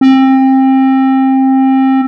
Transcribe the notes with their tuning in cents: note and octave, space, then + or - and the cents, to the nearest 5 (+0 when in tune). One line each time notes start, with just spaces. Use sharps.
C4 +25